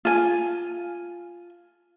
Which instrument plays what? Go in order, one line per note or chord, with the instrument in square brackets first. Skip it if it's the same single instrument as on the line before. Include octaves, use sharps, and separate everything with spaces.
[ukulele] F4 G#5